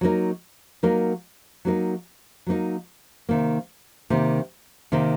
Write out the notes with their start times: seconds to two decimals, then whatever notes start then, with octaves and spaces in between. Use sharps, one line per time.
0.01 F#3 A#3 D#4 A#4
0.83 F#3 A#3 D#4 A#4
1.65 F#3 A#3 D#4 A#4
2.46 F#3 A#3 D#4 A#4
3.29 C3 D#3 A#3
4.10 C3 D#3 A#3
4.92 C3 D#3 A#3